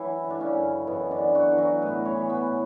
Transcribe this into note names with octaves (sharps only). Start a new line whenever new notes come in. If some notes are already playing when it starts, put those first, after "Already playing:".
Already playing: E3 F#3 E4
D3
D4
C#3 C#4
F#2
B2 E3 B3
D3 D4
E3
F#3 F#4
E3
F#3 F#4
A2 B3 B4
C#4 C#5
E3
B3 B4
A2